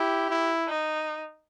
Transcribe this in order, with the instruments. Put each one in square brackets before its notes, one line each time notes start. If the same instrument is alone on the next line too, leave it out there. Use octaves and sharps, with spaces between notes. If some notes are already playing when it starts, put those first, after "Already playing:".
Already playing: [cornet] E4 [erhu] G4
[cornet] E4
[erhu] D#4